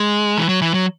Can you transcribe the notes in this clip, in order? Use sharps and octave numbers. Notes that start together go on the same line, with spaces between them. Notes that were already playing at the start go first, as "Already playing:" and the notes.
Already playing: G#3
E3
F#3
E3
F#3